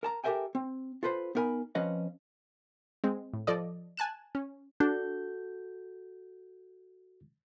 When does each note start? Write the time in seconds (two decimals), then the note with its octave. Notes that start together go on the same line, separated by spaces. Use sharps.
0.03 A#4 A5 A#5
0.24 G4 A4 A#4 E5 G5 G#5
0.55 C4
1.03 F4 A4 B4 C5
1.35 B3 D#4 A#4 G#5 B5
1.75 F3 C4 C#4 B4 D#5 F5
3.04 G#3 C4
3.34 A2
3.47 F3 A4 D5 D#5
3.97 G#5 A5 F#6 E7
4.35 C#4
4.80 D4 F#4 A4 G6